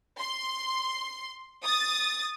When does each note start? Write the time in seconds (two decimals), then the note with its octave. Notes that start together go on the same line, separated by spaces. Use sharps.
0.19 C6
1.63 D#6 A6